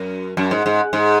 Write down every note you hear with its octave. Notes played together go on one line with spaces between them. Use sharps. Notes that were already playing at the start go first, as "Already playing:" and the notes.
Already playing: F#2
F#2
G#2
G#2
G#2